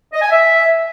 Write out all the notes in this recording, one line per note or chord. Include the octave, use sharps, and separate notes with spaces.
D#5
G#5
E5